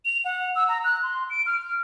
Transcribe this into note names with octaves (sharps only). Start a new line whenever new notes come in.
F7
F#5
E6
A#5
F#6
C6
D7
F6